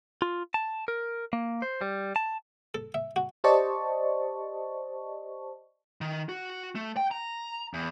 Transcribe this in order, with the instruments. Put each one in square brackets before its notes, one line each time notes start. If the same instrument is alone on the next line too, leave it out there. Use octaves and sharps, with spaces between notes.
[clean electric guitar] F4
A5
A#4
A#3
C5
G3
A5
[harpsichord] A4
E5
F#4
[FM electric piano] G4 C5 D5 D#5 A5 C#6
[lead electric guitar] D#3
F#4
A3
G5
A#5
E2